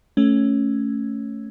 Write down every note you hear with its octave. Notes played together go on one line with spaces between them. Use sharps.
A3 C#4